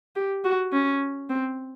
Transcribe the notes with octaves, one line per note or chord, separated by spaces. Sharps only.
G4
F#4
C#4
C4